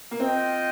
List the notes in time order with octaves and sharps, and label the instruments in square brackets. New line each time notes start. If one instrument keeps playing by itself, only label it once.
[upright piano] A#3
[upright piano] C4 [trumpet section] F4 D#5 G5